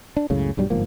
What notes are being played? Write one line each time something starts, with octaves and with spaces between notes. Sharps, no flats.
D4
C#2 F#2 A2 C#3
B1 G2 F#3 G3
G1 G#2 F3 A#3